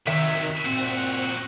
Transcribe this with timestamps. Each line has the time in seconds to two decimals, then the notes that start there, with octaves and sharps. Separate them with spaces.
0.07 C3 D#3 F#3 E5
0.65 A#2 C4 F#4